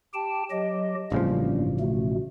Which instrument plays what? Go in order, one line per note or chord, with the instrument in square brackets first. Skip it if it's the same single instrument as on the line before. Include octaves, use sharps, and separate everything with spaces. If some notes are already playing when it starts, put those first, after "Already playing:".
[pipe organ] G4 G5 A5
F#3 G4 D#5
[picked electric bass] A1 C#3 F3 [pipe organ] G2 G3 A#3
[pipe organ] B2 A3